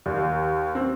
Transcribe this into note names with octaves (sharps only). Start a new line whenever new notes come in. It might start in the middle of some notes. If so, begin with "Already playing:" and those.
D#2
C4